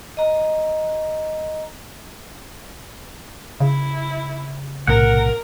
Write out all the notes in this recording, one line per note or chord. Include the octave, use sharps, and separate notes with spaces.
D#5 A#5
C#3 E4
B1 A2 C3 A#4 F#5